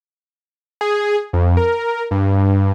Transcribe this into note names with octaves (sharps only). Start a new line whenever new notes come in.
G#4
F2
A#4
G2